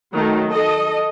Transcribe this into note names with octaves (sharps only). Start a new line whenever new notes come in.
D#3 F#3 A3
A4 D#5